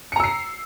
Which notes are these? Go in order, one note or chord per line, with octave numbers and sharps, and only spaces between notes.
A#5 E6 C7 C#7